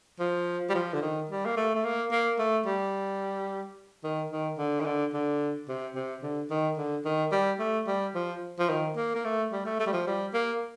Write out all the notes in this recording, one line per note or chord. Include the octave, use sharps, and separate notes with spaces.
F3
G3
F3
D3
D#3
G3
A#3
A3
A3
A#3
A#3
A3
G3
D#3
D#3
D3
D#3
D3
D3
C3
C3
D3
D#3
D3
D#3
G3
A3
G3
F3
F3
D#3
A#3
A#3
A3
G3
A3
A3
G3
F3
G3
A#3